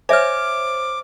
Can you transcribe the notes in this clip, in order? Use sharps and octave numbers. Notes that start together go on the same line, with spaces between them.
C5 C#5 E5 G#5 D6 F6